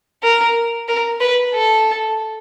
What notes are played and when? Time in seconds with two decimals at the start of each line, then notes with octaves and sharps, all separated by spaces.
0.23 A#4
0.88 A#4
1.21 B4
1.54 A4